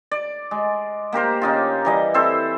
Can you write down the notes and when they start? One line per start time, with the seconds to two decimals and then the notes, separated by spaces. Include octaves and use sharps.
0.11 D5
0.51 G#3
1.13 A#3 G4 A#4 C5
1.42 C#3 D#4 F4
1.85 E3 G3 D#5
2.14 C4 E4 A4 C5